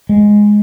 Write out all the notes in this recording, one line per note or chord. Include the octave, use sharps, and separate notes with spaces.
G#3